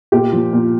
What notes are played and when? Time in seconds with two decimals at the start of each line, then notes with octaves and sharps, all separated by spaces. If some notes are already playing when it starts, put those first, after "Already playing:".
0.12 A#2 G4
0.32 F3
0.53 A#2